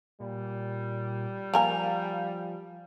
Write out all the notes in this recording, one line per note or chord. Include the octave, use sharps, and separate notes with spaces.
A#2 G3
F3 A#3 A#4 F5 G#5